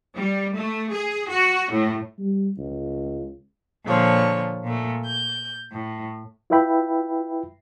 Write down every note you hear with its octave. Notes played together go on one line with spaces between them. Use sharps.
G3
A3
G#4
F#4
A2
G3
C#2
A#2 D3 F3 C#5
A#2 A3
G6
A2
E4 F4 B4 E5 G5 B5